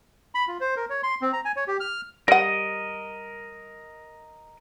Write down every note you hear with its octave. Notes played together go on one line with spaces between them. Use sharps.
B5
F4
C5
A#4
C#5
C6
C4
A#5
G#5
C#5
G4
F6
G3 A#4 D#5 F#5